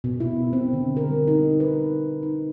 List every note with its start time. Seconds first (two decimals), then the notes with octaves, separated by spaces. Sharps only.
0.04 B2
0.20 E4
0.53 C4
0.73 D3
0.97 A#4
1.11 G3
1.28 D#4
1.60 B4
2.23 D#4